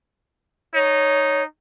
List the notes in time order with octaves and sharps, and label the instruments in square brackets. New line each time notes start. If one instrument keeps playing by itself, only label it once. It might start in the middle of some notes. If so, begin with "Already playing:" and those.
[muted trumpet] D#4 [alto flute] C#5